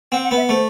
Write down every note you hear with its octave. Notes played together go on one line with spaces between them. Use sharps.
C4 F#5
F#5
B3
E5
A3 C5